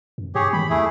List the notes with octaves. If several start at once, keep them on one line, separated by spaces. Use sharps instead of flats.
F#2
G2 G4 G#4 C#5
D#3 B5
D#2 A3 E4 G#4